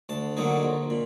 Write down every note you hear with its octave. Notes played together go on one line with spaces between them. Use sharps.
D2 A5
D3 F#3 A#3 D#4
A#1
A#2